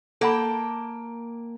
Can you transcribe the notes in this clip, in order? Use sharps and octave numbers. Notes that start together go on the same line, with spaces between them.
A#3 A4 F#5 G5 A5 B5